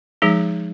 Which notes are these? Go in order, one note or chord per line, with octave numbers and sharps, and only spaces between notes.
F3 G#3 D#4 G#4